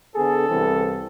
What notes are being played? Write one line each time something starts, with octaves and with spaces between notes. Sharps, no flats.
D3 B3 G#4 A4
C2 E3 C4